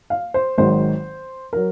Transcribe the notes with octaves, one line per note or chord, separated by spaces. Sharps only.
F5
C5
G#1 G#2 D#3 F#3 C5
F#3 A#4